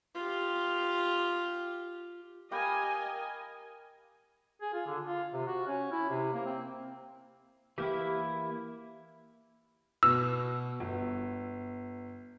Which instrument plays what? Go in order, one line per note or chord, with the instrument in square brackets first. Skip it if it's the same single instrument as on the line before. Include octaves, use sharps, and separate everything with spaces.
[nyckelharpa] F4 G4
[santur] G4 F5 B5 [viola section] A#4 D#5 G#5
[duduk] G#4
F4
D3
F4
C3
F#4
C#4
E4
C3
A#3
C4
[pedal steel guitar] E3 A#3 E4 [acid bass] G4
[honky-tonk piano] B2 [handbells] E6
[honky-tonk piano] G1